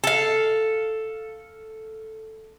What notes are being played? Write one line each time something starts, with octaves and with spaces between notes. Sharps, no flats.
A4 F5